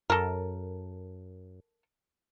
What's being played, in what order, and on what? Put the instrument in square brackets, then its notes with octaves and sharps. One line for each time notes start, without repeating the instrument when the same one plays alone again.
[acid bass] F#2 [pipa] A4 A#4